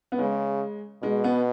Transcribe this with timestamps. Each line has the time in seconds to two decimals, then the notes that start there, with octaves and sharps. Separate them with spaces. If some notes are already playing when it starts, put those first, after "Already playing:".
0.12 B3
0.19 C#3 G#3
1.03 B2 G#3
1.24 B3